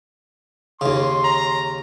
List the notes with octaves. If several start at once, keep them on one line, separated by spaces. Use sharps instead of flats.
D#2 C#3 C6
A#5